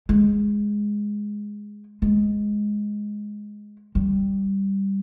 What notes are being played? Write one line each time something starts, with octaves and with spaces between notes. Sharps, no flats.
G#3
G#3
G3